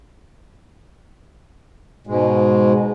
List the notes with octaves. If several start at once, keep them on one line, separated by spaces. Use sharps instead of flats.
G#2 B2 G#3